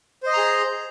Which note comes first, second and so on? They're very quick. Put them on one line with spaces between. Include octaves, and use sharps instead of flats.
C5 D#5 C6 A#5 G#4